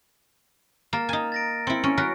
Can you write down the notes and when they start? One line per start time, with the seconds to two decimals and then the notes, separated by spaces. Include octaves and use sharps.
0.93 A#3 A#5 F6 A6
1.09 D#4 G#5
1.32 A6 A#6 D7
1.67 C4 E4 C#7
1.83 C#4
1.98 F#3 A#4 B4